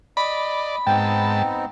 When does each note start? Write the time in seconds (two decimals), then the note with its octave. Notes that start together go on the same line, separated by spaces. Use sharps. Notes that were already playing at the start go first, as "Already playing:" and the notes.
0.17 D5 D#5 B5
0.87 G#2 B3 C4 D#4 G5 A5